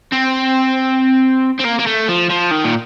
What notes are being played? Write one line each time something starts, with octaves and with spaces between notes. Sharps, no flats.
C4
C4
A#3
A#3
A3
F3
F3
D#3
A#2